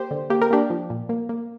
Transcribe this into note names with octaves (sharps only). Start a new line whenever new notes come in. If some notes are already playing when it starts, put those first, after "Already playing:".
Already playing: A#3 G4 C5
D3
A#3 G4
A#4
A#3 D4 G4
F3
A#2
A#3
A#3